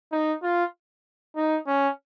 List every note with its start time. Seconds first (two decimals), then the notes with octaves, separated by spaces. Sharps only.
0.12 D#4
0.43 F4
1.36 D#4
1.67 C#4